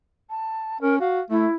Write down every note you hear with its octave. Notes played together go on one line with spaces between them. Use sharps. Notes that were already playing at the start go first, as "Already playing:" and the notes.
A5
C#4 A#4
F#4 F5
A3 E4